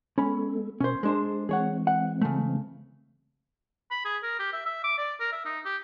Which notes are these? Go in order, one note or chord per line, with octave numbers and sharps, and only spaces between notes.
G#3 B3 C#4 A4 B5
B2 C#4 A#4 C5
G#3 D4 G#4 C5
E3 G#3 C4 G#4 C#5 F#5
F#5
C#3 A3
B5
G#4
A#4
G4
E5
E5
D6
D5
A#4
E5
D#4
G4